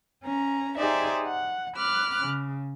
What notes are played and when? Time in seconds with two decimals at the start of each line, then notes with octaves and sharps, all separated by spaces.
0.23 C#4 A#5
0.77 D#4 G4 G#4 C5 D5 E5
1.27 F#5
1.76 B5 D6 F6 F#6
2.20 C#3